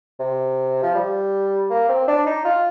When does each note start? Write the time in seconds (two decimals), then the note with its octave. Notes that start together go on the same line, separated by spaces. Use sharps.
0.19 C3
0.83 F3
0.95 G3
1.70 A#3
1.89 C4
2.08 D4
2.26 D#4
2.45 F4